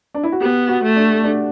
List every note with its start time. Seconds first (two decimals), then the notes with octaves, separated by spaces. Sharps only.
0.14 D4
0.23 E4
0.32 F#4
0.41 B3 G4
0.68 F#4
0.82 A3
0.96 D4
1.23 D4